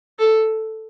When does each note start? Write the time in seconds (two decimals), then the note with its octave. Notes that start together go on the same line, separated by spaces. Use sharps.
0.19 A4